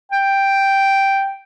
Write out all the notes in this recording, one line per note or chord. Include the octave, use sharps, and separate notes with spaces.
G5